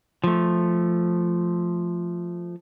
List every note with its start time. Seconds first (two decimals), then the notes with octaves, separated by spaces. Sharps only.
0.24 F3 A3